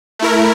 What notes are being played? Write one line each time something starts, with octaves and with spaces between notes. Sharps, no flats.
A3 E4 A#4